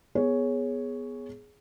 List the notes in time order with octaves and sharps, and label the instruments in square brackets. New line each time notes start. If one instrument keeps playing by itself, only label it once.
[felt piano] B3 G#4 C#5